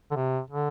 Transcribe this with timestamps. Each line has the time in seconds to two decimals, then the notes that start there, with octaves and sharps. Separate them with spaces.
0.11 D3
0.16 C3
0.50 D3